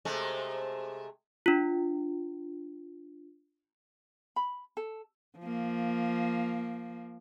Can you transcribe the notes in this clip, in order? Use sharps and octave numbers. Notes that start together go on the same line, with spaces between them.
C3 G#3 A3
D4 F4
B5
A4
F3 A#3